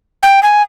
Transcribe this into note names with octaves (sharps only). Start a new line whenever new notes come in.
G5
G#5